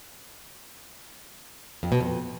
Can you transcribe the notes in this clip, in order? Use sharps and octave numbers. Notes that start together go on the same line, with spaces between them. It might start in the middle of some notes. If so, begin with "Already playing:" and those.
F2
B2
F2